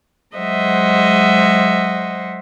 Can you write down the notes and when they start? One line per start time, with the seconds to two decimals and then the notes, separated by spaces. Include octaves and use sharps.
0.36 F#3 G#3 C5 D#5 E5 F#5